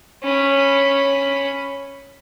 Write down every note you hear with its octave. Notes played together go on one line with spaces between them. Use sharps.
C#4 B5